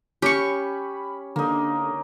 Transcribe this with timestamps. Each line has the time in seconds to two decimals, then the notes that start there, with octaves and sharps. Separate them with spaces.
0.22 C#4 G4 B5 C#6
1.36 D3 A#3 D#4